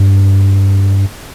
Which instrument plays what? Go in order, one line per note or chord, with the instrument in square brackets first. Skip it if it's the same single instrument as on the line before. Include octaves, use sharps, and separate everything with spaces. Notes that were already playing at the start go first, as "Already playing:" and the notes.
Already playing: [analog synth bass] G2